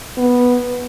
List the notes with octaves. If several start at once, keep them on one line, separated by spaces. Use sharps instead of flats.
B3